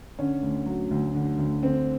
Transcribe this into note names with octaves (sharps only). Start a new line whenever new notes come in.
D3 C#4
D2
F#3
D2
D3
D2
D3 C4